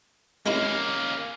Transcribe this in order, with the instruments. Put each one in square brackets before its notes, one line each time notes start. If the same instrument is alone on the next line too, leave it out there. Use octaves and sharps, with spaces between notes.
[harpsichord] G#3 D#4 E4 [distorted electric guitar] A#3 C#4